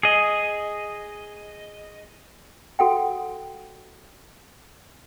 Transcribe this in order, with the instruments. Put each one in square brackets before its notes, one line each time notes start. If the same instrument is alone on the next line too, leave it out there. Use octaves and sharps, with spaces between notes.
[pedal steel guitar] G#4 D#5
[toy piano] F#4 A4 F#5 G5